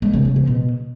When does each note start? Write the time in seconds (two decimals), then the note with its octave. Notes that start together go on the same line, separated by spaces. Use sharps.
0.02 G#3
0.13 C#3
0.25 C#3
0.36 F3
0.47 B2